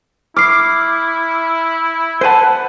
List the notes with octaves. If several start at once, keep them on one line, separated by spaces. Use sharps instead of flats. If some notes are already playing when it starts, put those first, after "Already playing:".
E4 D6 F6 C7
B4 C5 F#5 G#5 A5